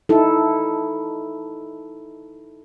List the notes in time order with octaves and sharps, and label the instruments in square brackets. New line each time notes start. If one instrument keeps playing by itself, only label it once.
[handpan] D#4 E4 A4